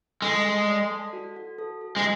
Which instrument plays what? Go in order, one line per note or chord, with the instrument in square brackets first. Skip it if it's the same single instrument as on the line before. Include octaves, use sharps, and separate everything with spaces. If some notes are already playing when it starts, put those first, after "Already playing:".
[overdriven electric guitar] G#3 [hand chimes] A4
[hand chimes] A4
D5
A4
F#4
F#4
A4
A4
[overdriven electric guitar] G#3